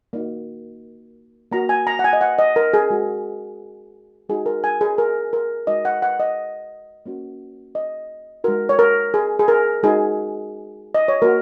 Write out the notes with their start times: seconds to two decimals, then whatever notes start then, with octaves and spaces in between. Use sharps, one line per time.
0.13 A#3 D#4 F#4
1.52 A#3 F#4 A#5
1.69 G#5
1.87 A#5
1.99 F#5
2.04 G#5
2.13 D#5
2.21 F#5
2.38 D#5
2.56 A#4
2.73 G#4
2.90 G#3 F#4
4.29 G#3 D#4 F#4 G#4
4.46 A#4
4.64 G#5
4.81 G#4
4.98 A#4
5.33 A#4
5.67 G#3 D#4 F#4 D#5
5.85 F#5
6.02 F#5
6.20 D#5
7.06 A#3 C#4 F#4
7.75 D#5
8.44 G#3 D#4 F#4 A#4
8.69 C#5
8.79 A#4
9.14 G#4
9.39 G#4
9.48 A#4
9.83 G#3 D#4 F#4 G#4
10.94 D#5
11.08 C#5
11.22 A#3 F#4 A#4